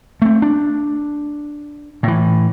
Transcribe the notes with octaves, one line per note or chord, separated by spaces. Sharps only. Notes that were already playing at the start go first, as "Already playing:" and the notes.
A3 C4
D4
A2 E3